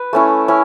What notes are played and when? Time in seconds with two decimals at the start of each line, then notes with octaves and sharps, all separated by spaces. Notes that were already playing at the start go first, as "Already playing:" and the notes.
Already playing: B4
0.13 A3 C#4 E4
0.48 C#4 E4